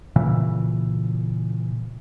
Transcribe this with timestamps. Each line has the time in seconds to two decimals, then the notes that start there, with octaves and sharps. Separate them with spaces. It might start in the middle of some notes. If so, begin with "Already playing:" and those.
0.16 A#2 C#3 E3